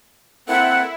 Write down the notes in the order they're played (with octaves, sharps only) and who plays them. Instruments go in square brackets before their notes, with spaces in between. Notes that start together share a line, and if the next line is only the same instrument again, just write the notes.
[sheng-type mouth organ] A#3 C4 A4 [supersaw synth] E4 [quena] F#5